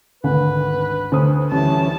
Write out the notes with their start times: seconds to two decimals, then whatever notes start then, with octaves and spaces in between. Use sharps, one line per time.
0.24 G#1 D2 B4 F#5
1.12 D2 C5 D#6
1.52 D2 E3 G3 C#4 A5